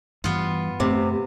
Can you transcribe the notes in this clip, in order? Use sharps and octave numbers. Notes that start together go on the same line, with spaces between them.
G2 E3 G3 B3 F4
F#2 C3 A3